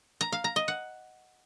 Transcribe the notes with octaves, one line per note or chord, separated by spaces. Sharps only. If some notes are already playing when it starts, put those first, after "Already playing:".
A#5
F5
A#5
D#5
F#5